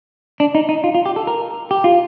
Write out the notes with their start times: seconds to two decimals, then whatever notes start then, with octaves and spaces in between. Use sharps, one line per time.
0.40 D4
0.55 D#4
0.69 D#4
0.84 F4
0.95 F4
1.06 G4
1.16 A4
1.27 A#4
1.71 G4
1.84 F4